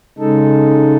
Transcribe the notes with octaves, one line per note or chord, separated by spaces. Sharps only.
C#3 G#3 D#4 A4